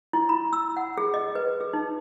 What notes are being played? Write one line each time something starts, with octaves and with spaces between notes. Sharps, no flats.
E4
B5
E6
F#5
G#4
D#5
B4
G#4
D#4